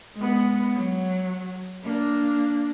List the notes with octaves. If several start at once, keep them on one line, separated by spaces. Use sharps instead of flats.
G#3 B3
F#3
A#3 D4